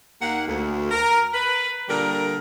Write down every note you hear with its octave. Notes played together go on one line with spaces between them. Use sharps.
D#2 D#3 A#3 F#5
D2
A#4
B4
A#2 D3 G3 A#4